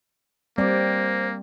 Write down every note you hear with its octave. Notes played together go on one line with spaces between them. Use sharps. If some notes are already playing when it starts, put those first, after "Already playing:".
G3 A#3 C4 C5 D5